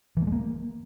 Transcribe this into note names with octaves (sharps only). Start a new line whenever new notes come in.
E3
A#3
G#3
A#3